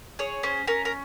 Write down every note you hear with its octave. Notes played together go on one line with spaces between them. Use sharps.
G#4 C#5
C#4 C5
C#4 A#4
A#4